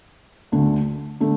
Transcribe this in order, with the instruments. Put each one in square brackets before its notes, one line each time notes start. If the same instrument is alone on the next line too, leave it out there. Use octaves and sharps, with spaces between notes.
[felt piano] D2 D3 A3
D3 A3